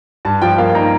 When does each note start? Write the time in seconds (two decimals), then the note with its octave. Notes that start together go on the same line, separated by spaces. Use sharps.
0.25 G2 A5
0.42 F3 G5
0.58 A#3 F5
0.75 D#4 A#5